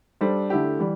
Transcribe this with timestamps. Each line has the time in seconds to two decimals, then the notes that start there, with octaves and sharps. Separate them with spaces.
0.21 G3 D4 A4 C5
0.50 D3 A3 E4 G4
0.79 E3 G3